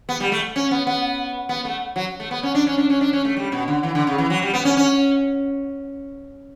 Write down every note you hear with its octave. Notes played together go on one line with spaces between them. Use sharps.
B3
G3
A3
C#4
B3
B3
B3
A3
F#3
A3
B3
C#4
D4
C#4
D4
C#4
D4
C#4
A3
G3
B2
D3
E3
D3
C#3
E3
F#3
G3
B3
C#4
C#4